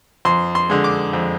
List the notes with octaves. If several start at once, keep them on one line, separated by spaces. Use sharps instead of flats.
F2 C6
C6
D3 G#3
D6
F2